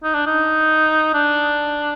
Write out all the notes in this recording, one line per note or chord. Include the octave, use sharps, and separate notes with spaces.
D#4
D4
D#4
D4